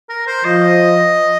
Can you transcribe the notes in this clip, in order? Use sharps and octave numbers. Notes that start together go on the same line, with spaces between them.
A#4
C5
F3 D#5